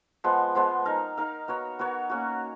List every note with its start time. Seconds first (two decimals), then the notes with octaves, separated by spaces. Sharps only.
0.24 F3 G#3 B3
0.55 F3 G#3 B3
0.86 D#4 A#4 F5
1.17 D#4 A#4 F5
1.48 B3 F#4 A#4 C#5
1.79 B3 F#4 A#4 C#5
2.10 A#3 C#4 F#4